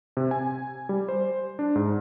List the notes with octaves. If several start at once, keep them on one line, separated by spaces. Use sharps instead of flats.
C3
G#5
G3
C5
D4
G#2